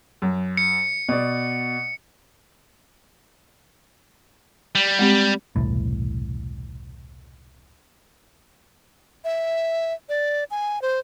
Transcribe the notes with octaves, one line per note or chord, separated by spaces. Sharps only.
F#2
C#7
B2 D5
G3
G#3 C4 G4
E1 C2 A2
E5
D5
G#5
C5